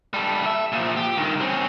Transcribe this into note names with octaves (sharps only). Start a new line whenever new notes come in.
G3 A4
E5
A#2 F3
G4
G2 D#3
C4 C#4